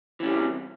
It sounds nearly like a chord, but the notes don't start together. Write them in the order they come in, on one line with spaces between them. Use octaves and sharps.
E3 C#4 G3 C3